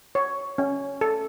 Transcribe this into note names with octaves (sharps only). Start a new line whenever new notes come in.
C#5
C#4
A4